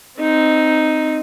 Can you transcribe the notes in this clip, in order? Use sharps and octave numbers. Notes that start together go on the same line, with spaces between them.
C4 D#4